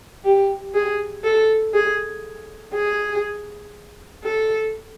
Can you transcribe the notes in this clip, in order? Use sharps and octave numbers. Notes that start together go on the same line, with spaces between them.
G4
G#4
A4
G#4
G#4
A4